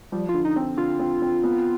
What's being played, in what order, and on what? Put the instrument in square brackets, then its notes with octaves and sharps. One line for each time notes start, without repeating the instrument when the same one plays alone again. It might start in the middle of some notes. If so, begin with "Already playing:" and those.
[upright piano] F3 [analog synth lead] G3
[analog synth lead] F4
[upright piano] D3
[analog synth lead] D#4
[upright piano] C4
[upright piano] D3 [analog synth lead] F4
[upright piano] C4
C4
B3